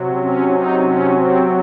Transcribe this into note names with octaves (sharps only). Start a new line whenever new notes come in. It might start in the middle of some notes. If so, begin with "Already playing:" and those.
Already playing: C3 F#3
C#4
D#4
C#4
C4